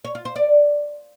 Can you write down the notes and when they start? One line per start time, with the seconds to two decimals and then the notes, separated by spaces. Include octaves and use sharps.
0.05 C#5
0.15 F4
0.25 C5
0.36 D5